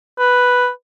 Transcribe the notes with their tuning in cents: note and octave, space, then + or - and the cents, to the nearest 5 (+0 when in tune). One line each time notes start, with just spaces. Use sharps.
B4 +0